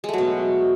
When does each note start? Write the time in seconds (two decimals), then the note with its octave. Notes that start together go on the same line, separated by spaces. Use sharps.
0.04 G#3
0.09 A3
0.13 F#3
0.18 B2